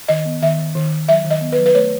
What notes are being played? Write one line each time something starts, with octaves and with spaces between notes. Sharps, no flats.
D#3 D#5
B3
D#3 E5
D#3
D#3
D#3
F#3 E5
D#3
D#5
B3
B4
F#3
B4
A3 C#5